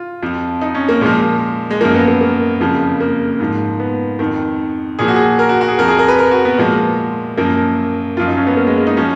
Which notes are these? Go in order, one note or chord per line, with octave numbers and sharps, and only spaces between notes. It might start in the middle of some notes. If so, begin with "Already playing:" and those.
Already playing: F4
F2 F3
D#4
C#4
A#3
A#2 F3 G#3
G#3
F#2 F3 A#3
B3
A#3
A#3
F2 C#3 F3
A#3
G#2 F3
B3
F2 D#3
A#2 F3 G#4
F#4
G#4
A#4
F#4
F#4
G#4
F2 F3 A#4
G#4
A#4
B4
A#4
F#4
B3
A#2 F3 G#3
F#2 F3 A#3
F#2 F3 F4
D#4
C#4
B3
A#3
G#3
G#3
D#4
F3 C#4